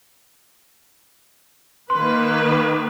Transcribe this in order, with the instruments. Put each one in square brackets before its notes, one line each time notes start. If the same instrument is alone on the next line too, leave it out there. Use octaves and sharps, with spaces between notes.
[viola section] D#3 A#3 B4 [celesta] C6